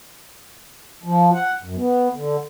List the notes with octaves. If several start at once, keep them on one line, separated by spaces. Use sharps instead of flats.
F3
F#5
F#2
B3
D3